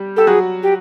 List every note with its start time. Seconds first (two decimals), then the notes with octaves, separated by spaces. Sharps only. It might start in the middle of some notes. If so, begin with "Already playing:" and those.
Already playing: G3 G4
0.16 G4 A4
0.27 F#3 F#4 G#4
0.63 G4